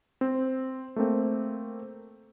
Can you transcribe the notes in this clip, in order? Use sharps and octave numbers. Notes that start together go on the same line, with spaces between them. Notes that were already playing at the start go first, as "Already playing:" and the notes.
C4
A3 A#3 C4